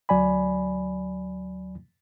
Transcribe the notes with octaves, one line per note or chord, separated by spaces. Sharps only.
D2 F#3 D5 G#5 B5